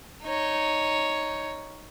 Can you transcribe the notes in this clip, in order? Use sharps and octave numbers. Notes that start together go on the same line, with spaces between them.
D#4 C#5